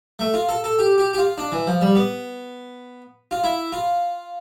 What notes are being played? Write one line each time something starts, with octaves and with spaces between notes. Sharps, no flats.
A3
F4
A4
A4
G4
G4
G4
F4
D4
E3
F3
G3
B3
F4
E4
F4